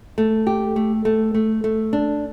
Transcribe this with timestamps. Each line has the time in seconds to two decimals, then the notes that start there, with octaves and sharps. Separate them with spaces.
0.18 A3
0.47 G4
0.76 A3
1.05 A3
1.34 A3
1.64 A3
1.93 D4